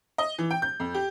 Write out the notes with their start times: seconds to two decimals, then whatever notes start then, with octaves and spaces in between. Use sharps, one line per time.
0.18 D#5
0.38 E3
0.51 G5
0.62 G6
0.80 F2
0.94 G4